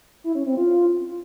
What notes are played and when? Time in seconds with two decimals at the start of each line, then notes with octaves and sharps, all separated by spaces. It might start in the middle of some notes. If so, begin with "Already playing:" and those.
0.24 E4
0.35 C#4
0.46 C4
0.57 F4